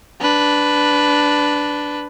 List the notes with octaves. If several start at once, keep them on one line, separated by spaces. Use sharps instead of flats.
D4 B4